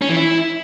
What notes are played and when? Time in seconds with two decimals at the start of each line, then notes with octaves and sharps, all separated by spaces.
0.02 C#4
0.09 E3
0.16 E4